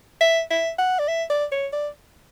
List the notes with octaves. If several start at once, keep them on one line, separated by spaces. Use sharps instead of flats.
E5
E5
F#5
D5
E5
D5
C#5
D5